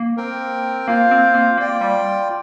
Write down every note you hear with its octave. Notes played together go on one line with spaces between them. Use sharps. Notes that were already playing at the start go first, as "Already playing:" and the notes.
Already playing: A#3
C4 A#4 G5
A#3 F4 C5 F5
C4
A#3
A#3 F4 D5 G5
G3